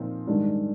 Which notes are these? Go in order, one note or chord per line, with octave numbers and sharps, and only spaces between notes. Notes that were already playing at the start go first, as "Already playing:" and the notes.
Already playing: A#2 F3 C4 D#4
G#2 D#3 G3 D4